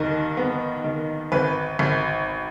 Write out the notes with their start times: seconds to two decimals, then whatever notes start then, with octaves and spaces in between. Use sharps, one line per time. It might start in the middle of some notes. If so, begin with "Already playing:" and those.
Already playing: D#2 D#3
0.37 B3
0.84 D#3
1.32 G#1 B4
1.79 G#1